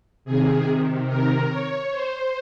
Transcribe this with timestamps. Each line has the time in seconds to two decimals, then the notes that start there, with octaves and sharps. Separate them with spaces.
0.25 C3 D#3 G#4
1.07 A#4
1.50 C#5
1.91 C5